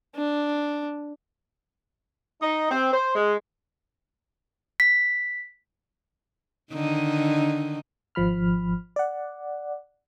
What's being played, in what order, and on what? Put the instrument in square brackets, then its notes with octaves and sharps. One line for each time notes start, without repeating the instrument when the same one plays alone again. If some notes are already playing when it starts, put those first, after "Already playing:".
[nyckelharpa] D4
[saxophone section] D#4
C4
C5
G#3
[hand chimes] B6
[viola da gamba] D3 D#3 D#4
[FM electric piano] G#1 F3 B5 F6
D5 F#5